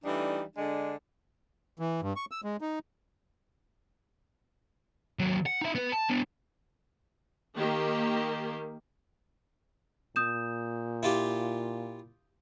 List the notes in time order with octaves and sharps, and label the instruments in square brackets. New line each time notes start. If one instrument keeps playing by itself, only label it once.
[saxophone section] E3 G3 A3 D4 D#4
D3 G#3 D4
[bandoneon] E3
G2
C#6
E6
G#3
D#4
[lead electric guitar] D#2 F#3
F#5
D#4 E5
B3 B4
A5
B3 D4
[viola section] D#3 A#3 G4
[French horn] A#2 [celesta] D#6 G6 E7
[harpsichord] E4 F4 G4